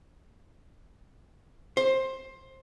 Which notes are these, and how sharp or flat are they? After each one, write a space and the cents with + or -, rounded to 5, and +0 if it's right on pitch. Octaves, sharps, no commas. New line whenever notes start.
C5 +15